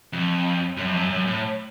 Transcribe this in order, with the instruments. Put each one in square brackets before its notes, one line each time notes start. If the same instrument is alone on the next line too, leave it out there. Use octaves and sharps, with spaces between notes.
[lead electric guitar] F2
F#2
F2
F#2
F#2
A2